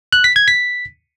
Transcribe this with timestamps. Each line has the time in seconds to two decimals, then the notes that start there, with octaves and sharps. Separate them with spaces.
0.13 F#6
0.24 B6
0.36 G#6
0.48 B6